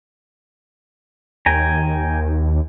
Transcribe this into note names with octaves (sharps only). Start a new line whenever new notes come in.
D#2 G5 G#5 A#5